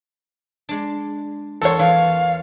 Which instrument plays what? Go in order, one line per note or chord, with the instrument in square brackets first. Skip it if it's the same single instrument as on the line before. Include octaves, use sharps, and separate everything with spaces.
[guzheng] G#3 D4
[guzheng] E2 A#4 C6 [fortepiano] A4 C#5
[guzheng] E3 [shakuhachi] F5